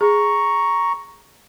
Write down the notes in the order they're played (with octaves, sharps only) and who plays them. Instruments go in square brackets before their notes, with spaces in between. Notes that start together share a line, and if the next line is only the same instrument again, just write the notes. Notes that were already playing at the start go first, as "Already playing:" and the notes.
[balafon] G#4 [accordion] A#5 C#6